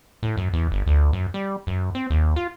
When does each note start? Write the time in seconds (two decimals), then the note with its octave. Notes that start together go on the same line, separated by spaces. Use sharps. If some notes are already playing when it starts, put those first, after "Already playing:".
0.23 A2
0.37 F#2
0.53 E2
0.72 G1
0.87 D2
1.13 F#2
1.34 G3
1.67 F#2
1.95 C4
2.10 D#2
2.36 F4